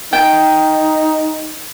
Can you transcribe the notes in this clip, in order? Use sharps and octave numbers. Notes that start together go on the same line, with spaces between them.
D#4 G5